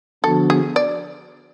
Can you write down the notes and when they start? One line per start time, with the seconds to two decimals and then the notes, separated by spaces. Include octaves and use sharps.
0.24 D3 F3 B3 D4 F#4 A4
0.50 G#4
0.76 D5